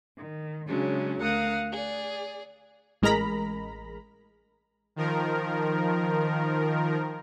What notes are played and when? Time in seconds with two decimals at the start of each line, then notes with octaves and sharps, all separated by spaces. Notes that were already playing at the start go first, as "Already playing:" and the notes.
0.17 D#3
0.67 C#3 F#3 G#3 C#4 D4
1.20 D2 A#4 F5 F#5 D#6
1.71 G#4 D5
3.02 A1 G#3 A#4 A#5 B5
4.96 D#3 F3 A#4